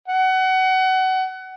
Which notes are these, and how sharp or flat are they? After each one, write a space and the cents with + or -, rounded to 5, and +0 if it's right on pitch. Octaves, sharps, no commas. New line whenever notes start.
F#5 +25